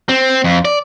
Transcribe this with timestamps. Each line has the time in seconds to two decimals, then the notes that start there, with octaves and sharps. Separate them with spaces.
0.09 C4
0.44 F2
0.65 D5